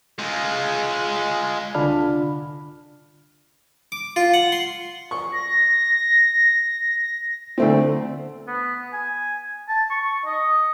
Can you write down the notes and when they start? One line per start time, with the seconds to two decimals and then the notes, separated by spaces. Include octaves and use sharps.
0.19 G#3 F4
1.75 C2 D3 D4 F4 B5 F6
3.92 D6
4.16 F4
4.34 F#5
4.52 C6
5.11 C#6
5.33 A#6
7.58 D2 A3 C4
8.47 B3
8.93 G#5
9.69 A5
9.91 C#6
10.26 D#5